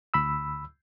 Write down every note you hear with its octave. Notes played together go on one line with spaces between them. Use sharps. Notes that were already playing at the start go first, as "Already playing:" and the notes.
D2 B5 E6